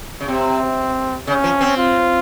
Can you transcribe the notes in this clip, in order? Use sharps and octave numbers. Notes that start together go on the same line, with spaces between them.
C#3
C3 C4
C#3 C#4
F3
C4
F4